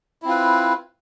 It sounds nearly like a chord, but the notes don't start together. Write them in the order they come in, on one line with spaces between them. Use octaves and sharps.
E4 C4 F4 B4